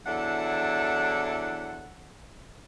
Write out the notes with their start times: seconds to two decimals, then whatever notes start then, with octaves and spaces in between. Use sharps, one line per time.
0.06 E2 F#3 D4 E4 A4 F#5